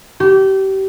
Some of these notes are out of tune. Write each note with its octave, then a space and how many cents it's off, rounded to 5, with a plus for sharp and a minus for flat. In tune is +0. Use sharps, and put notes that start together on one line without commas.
G4 -30